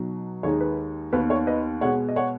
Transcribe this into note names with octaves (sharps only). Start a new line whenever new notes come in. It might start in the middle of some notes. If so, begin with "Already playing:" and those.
Already playing: B2 F#3 D#4
D#2 D#3 G#3 D#4 C#5
B4
D#2 D#3 B3 B4
C#5
B4 D#5
B2 G#3 B3 C#5 F#5
D#5
C#5 F#5